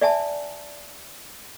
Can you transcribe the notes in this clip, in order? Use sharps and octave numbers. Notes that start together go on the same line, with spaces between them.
D5 E5 G#5 A5